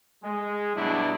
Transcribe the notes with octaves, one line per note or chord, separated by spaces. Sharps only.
G#3
G2 B2 F#3 D4 E4